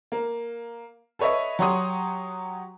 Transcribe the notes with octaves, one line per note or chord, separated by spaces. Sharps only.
A#3
A4 B4 C#5 D#5 E5
F#3 G4 C#5 F#5 C6 D#6